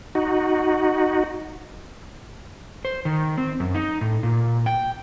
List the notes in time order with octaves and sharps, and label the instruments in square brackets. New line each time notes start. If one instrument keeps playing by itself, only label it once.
[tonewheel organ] D#4 F#4
[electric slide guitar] C5
D#3
C4
F#2
D#4
A2
A#2
G5